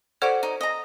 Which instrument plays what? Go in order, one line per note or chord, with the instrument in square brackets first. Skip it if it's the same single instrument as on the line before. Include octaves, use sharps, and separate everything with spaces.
[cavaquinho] F#4 D6 [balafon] A4 C5 D5
[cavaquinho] D#4
D#5 A#5